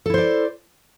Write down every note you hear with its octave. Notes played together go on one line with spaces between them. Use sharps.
E4 A4 C5 D5